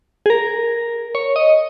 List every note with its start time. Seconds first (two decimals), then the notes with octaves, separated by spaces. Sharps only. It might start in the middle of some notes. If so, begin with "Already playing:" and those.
0.26 G#4
0.30 A#4
1.15 C#5
1.36 D#5